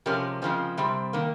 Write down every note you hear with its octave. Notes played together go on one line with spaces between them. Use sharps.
C3 F3 G#3 C#4 G4 A#4
C#3 F3 G#3 C4
C3 G3 C4
D#3 A#3